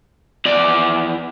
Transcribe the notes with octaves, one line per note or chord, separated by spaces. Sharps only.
E2 D5